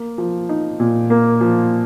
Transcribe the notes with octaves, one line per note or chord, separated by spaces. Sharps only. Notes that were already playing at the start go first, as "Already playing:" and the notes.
Already playing: A#3
F3
D#4
A#2
A#3
F3